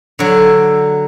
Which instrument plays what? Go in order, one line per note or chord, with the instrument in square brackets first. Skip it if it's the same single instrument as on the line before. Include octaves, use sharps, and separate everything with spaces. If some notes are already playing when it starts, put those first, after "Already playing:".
[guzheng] D3 F#3